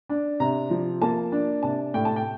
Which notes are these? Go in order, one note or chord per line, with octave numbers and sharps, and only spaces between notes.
D4
C3 A#5
F3
A#3 A5
D4
C3 A5
A2 G5
A5
G5